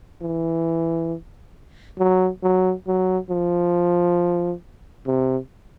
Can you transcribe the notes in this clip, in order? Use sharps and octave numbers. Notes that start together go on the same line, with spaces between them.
E3
F#3
F#3
F#3
F3
C3